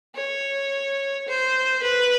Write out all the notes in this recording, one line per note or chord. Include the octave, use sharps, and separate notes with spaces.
C#5
C5
B4